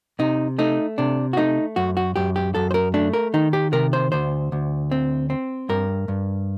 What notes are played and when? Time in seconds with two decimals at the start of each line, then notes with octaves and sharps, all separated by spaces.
0.19 C3 D#4
0.58 A3 D#4
0.98 C3 D4
1.33 F#4
1.37 A3 D#4
1.76 F#2 F#4
1.97 F#4
2.16 F#2 G4
2.36 G4
2.55 F#2 A4
2.71 C5
2.74 A#4
2.94 A3 D4
3.13 A#4
3.34 D#3 D#4
3.53 G4
3.72 C3 A#4
3.93 C5
4.12 D2 C5
4.52 D2
4.91 C4
5.30 C4
5.69 G2 A#4
6.08 G2